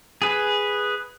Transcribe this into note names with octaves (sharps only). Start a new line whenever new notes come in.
G#4 B4